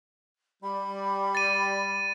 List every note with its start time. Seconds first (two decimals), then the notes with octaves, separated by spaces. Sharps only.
0.63 G3 D5 B5
1.35 A6 D#7